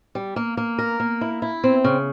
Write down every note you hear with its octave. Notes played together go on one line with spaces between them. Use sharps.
G3
A#3
A#3
A#4
A#3
E4
E4
C4
C#3